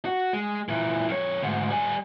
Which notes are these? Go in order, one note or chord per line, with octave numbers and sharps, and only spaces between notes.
F#4
G#3
A#2 E3
F2 C#5
D2 G#2
G3 G#5